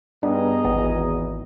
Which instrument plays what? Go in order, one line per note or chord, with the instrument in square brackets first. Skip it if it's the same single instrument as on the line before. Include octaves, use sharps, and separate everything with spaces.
[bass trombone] G2 [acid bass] B3 [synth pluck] D4 [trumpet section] G#4 D#5 A#5
[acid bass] G#1 [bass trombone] E2 [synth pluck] B3